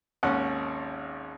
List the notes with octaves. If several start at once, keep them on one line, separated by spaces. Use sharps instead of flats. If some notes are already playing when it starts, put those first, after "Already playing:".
G#1 D#2 C#4 F#5